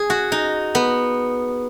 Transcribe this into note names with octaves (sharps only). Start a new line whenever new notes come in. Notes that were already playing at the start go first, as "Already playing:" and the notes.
Already playing: G#4
F#4
D#4
B3